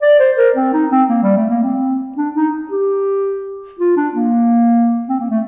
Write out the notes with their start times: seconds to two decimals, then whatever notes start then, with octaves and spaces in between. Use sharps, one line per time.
0.02 D5
0.19 C5
0.37 A#4
0.56 C4
0.73 D#4
0.91 C4
1.09 A#3
1.23 G3
1.37 A3
1.50 A#3
1.63 C4
2.17 D4
2.36 D#4
2.71 G4
3.79 F4
3.97 D4
4.15 A#3
5.09 C4
5.20 A#3
5.30 A3